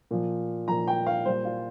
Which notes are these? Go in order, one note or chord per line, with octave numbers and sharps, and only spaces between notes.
A#2 F3
A#2 F3 A#5
G5
F5
A#2 G3 C5
F4